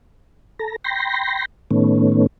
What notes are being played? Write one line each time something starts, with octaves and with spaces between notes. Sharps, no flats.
A4 A#5
G5 B5 C6 A#6
A2 D#3 A3 B3 C#4